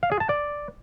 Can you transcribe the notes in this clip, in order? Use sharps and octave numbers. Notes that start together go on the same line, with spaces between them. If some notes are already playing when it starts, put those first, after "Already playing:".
F5
G#4
A5
D5